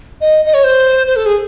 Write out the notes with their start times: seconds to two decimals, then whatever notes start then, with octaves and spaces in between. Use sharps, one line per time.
0.21 D#5
0.45 D#5
0.54 C#5
0.64 C5
1.07 C5
1.16 A4
1.26 G#4